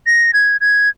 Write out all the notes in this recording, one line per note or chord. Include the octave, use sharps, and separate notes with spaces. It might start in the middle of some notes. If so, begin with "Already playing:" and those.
A#6
G#6
G#6